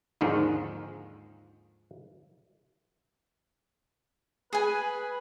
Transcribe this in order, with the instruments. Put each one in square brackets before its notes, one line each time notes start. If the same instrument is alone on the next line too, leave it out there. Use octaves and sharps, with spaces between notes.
[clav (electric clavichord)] D#2 G#2 D3 D#3 F3
[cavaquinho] G#4 G#5 [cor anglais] B4